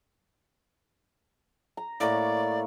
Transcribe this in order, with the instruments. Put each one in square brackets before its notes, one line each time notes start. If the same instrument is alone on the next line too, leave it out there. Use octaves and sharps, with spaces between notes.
[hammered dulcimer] A#5
[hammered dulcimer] A2 A#3 C#5 [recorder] D5